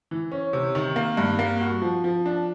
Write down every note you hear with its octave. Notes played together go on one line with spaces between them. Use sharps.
E3
C#4
C3
D#3
A#3
G2
A#3
F#4
F3
F3
D4